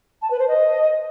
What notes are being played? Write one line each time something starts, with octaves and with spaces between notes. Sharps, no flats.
A5
B4
C5
D#5